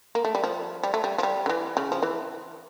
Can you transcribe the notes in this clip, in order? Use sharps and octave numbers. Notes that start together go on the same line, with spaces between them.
A#3
A3
G3
F3
G3
A3
G3
F3
G3
D3
E3
C#3
F3
E3